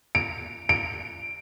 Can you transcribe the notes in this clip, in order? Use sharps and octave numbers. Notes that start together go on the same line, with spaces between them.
D7
D7